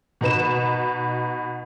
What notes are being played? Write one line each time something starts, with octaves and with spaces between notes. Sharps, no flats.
B2 D#4 B4 E7